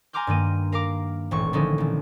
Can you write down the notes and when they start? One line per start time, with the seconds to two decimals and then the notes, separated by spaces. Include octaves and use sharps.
0.13 G#5 A#5 C6 D6 F6 G6
0.27 G2 D#3 A#3 D#7
0.72 A#4 F5 A#5 D6
1.31 D#1 A1 C#6
1.53 D3 D#3 F3 C#4 D#4 E4
1.78 A1 A#2